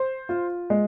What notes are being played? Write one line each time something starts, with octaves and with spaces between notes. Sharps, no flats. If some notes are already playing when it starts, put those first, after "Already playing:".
Already playing: C5
F4
G#3